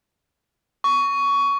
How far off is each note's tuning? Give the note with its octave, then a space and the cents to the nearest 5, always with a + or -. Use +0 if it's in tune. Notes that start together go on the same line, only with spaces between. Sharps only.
C#6 +20